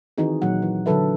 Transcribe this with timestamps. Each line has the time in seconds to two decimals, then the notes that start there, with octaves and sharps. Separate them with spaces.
0.18 D#3 E3 C4 D#4 F#4 G#4
0.42 A#2 F#3 F#5
0.62 E3
0.86 D3 E3 F#3 A4 B4 E5